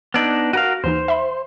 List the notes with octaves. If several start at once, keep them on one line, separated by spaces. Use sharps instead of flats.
B3 D4 D#4 E6 G#6
F#4 A#4 F5 D7
D#2 E3 D#4 C5
E5 B5